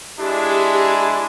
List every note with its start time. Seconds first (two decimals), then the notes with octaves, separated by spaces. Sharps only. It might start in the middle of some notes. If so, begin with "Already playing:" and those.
0.18 G#3 D4 E4 G4